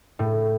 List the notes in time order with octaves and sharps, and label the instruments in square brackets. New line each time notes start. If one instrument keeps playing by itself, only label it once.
[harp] A2